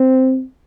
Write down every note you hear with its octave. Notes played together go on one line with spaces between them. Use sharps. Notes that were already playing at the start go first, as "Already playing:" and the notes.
Already playing: C4